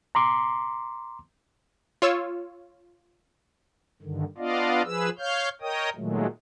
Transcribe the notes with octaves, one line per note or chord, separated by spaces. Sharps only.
A#5 C6 D6
F4 C#5 E6
G2 D3 D#3
B3 D4 F4 D5 D#5 F5
F3 G#4 B4 E6
C#5 F5 F6 G6
A#4 C#5 D#5 G5 D#6
A#2 D#3 F#3 G#3 A3